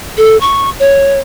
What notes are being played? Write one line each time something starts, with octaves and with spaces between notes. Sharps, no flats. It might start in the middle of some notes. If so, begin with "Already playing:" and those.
A4
C#6
C#5